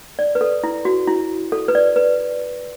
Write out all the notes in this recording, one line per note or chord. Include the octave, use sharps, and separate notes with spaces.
D5
B4
A4
E4
F#4
E4
A4
B4
D5
B4